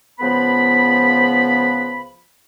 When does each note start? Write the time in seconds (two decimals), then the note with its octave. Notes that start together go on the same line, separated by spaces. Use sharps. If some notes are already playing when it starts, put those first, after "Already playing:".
0.20 C#2 F3 B3 B4 B5